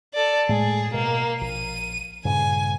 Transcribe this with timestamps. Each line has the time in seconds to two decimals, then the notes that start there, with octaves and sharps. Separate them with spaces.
0.14 A4 D5
0.49 A2 G#3 G#4
0.94 B2 A#3
1.41 A#1 D#7
2.25 G2 A#2 C#3 G#5